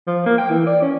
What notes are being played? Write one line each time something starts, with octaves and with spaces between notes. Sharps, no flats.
F3
A#3
G5
E3
D5
C#4